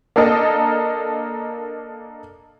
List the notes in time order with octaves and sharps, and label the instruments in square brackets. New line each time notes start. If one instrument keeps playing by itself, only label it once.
[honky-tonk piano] A#3 D4 A4 A#4 D#5 A5